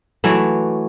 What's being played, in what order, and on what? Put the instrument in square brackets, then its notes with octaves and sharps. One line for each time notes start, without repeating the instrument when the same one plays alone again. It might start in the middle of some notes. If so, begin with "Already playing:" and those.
[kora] E3 F#3 A3